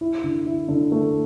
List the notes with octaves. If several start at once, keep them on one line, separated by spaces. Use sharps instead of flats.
E4
D3
E4
D3
A3